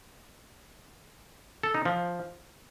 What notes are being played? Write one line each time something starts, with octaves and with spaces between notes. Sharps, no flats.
A4
D#4
F3